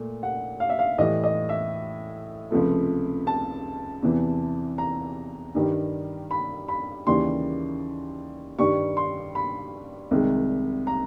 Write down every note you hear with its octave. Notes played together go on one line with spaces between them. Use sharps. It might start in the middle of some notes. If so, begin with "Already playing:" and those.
Already playing: A#2 A3
F#5
F5
E5
F5
A2 E3 G3 D#5
D#5
E5
C#2 C3 F3 A3
A5
E2 C3 E3
A#5
G2 D#3 G3
B5
B5
D#2 C#3 E3 G3 C6
G2 D#3 G3 C#6
C6
B5
C2 C3 D#3 G#3
A#5